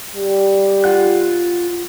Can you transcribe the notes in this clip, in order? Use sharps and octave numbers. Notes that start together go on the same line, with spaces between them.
G3
F4 F#5 F#6